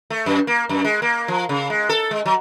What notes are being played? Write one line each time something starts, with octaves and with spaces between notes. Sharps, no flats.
A3
F#2
A#3
F#2
G#3
A#3
F3
C#3
G#3
A4
G#3
F#3